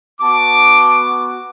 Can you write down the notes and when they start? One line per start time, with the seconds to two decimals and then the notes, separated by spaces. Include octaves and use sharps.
0.21 B3 F#4 A5 D6